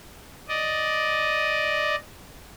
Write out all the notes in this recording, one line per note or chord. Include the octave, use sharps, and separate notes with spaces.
D5 D#5